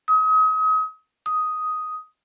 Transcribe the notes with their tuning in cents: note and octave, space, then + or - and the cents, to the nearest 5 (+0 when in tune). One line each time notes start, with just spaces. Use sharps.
D#6 +35
D#6 +5